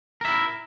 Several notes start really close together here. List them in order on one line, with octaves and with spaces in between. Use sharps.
A#4 E5 E4